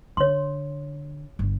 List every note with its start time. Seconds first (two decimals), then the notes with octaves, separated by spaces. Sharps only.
0.17 D3 C#5 C6
1.39 G1